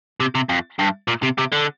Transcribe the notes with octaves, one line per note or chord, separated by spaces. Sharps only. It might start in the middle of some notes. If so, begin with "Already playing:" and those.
C3
C3
F2
G2
A#2
C3
C3
D3